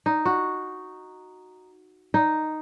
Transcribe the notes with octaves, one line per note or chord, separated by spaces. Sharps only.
D#4
F#4
D#4